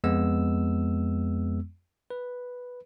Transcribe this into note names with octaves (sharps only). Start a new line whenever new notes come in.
F2 G#3 B3 E6
B4